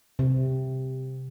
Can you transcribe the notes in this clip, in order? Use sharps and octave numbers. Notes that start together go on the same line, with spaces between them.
C3